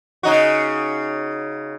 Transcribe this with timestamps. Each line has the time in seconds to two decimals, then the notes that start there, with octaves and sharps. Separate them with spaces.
0.23 C#3 D#4 F#4